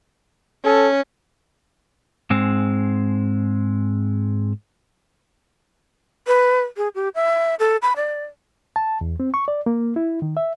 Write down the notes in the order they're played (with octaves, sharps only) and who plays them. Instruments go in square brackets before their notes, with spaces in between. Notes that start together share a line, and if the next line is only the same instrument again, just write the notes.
[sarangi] C#4 [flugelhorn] A4
[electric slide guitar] G#2 G#3 C4
[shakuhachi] B4
G#4
G4
E5
A4
B5
D5
[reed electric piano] A5
E2
C4
C#6
D5
A#3
E4
D#3
E5